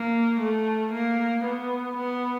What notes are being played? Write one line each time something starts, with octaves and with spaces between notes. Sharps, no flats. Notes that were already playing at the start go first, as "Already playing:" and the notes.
Already playing: A#3
A3
A#3
B3
B3